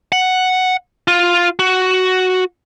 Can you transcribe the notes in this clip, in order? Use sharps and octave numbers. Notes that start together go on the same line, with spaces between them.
F#5
F4
F#4